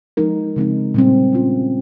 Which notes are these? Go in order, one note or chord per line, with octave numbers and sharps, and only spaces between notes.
F3 G#3 D#4 A#4
C#3 F3 G#3 C4 D#4
A#2 G3 C4
G3 C#4 F4